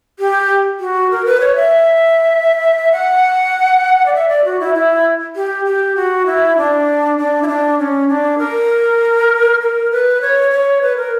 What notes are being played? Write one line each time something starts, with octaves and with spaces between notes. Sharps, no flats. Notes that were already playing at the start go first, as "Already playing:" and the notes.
G4
F#4
A#4
B4
C#5
E5
F#5
D5
E5
D5
F#4
E4
E4
G4
G4
F#4
E4
D4
D4
E4
D4
C#4
D4
A#4
A#4
B4
C#5
C#5
B4
A#4